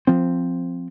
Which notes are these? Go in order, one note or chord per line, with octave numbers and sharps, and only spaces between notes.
F3 C4